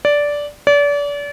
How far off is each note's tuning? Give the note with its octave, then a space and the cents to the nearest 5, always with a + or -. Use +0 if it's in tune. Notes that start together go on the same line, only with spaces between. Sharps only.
D5 -10
D5 -35